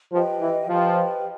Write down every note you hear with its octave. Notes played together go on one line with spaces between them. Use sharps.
F3 G4 B4 D#5 G5
E3
F3 G4 B4 D#5 G5